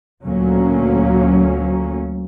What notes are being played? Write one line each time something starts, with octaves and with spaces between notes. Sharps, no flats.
D2 A#2 F#3 A#3 C#4